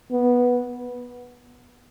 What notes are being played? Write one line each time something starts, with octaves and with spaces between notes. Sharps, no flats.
B3